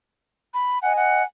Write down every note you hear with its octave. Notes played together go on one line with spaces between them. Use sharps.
B5
D#5 F#5 G#5
F#5